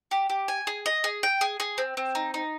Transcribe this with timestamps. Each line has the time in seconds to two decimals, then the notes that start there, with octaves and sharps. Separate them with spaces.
0.11 G4
0.30 G4
0.48 G#5
0.67 G#4
0.86 D#5
1.04 G#4
1.23 G5
1.41 G#4
1.60 G#4
1.78 C4
1.97 C4
2.15 D#4
2.34 D#4